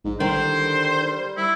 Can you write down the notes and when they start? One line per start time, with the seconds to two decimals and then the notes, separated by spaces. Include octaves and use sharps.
0.04 A#1 G#2
0.20 D3 D#3 G3 C5
1.37 E4